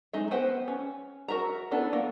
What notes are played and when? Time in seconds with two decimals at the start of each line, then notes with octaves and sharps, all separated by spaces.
0.13 G#3 D#4 E5
0.31 B3 B4 C5 G5
0.68 C#4
1.28 F#4 A#4 E5 A#5
1.71 B3 D4 E4 A4 B4
1.93 A#3